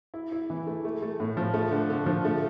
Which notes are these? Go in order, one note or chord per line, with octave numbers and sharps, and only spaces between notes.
E4
E4
E3
A3
A3
A3
A2
F3
A3
D3
D3
F3
A3